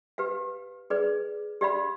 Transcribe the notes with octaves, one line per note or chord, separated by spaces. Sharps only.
G4 B4 F5
G#4 B4 D5
G4 D5 F5 B5